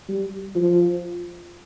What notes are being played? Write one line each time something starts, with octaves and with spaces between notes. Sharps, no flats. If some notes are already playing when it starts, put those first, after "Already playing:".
G3
F3